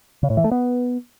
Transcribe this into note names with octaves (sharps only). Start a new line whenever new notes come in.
C#3
A2
E3
A3
B3